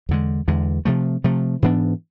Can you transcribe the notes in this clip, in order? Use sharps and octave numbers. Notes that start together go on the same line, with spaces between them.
E2 D3 G#3
E2 D3 G#3
C3 F3 A3
C3 F3 A3
G#2 E3 B3 D4